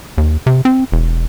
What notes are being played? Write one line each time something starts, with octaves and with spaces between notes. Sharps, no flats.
D#2
C3
C4
E1